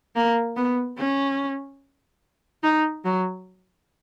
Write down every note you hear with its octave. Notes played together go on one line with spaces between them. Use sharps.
A#3
B3
C#4
D#4
F#3